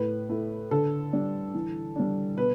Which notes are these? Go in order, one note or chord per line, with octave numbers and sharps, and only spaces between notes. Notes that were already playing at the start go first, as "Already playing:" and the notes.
Already playing: A2 B4
A3 E4
D3 A4
G3 D4
E3
G3 D4
B2 B4